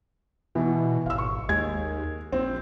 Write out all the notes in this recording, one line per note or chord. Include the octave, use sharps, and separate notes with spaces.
B2 E3
G#1 F5 E6
C#6
D#2 G#3 G#6
A#1 C4